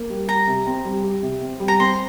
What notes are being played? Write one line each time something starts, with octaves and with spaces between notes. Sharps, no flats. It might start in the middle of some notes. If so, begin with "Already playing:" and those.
Already playing: A#3
G3
G4 A#5
C3
C4
G3
G4
C3
C4
G3
A#5
C4 C6